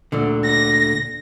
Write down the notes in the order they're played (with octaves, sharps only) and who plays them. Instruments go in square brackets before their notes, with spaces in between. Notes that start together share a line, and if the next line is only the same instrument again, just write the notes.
[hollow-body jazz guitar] D2 A#2 D3
[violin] A#6